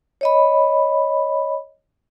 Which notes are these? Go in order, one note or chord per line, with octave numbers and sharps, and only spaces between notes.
C#5 D#5 B5